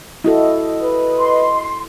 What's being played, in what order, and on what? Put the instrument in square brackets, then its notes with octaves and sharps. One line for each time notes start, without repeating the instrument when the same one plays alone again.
[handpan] E4 F#4 A4 [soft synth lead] D#5
[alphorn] B4
[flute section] C6